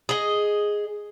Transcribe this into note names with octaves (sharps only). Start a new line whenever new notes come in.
G#4 D#5